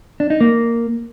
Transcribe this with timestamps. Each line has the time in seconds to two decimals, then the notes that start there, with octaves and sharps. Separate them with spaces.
0.20 D4
0.30 D#4
0.41 A#3